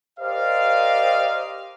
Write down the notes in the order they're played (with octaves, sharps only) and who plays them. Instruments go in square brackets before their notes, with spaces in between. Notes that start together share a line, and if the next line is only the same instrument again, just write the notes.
[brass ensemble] G4 A#4 C5 D5 D#5 F5